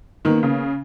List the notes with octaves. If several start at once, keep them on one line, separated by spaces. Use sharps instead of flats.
D#3 A#3 B3 C#4
C#3